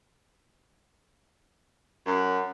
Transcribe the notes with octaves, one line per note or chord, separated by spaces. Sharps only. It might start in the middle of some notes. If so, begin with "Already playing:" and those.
F#2